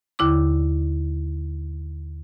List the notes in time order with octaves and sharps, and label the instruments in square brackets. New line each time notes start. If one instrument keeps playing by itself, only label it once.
[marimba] D#2 D3 E4 D6